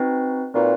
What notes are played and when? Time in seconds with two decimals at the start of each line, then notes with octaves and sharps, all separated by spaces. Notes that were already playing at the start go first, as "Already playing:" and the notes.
Already playing: C4 D#4 F#4 B4
0.54 A#2 C4 D#4 F#4 B4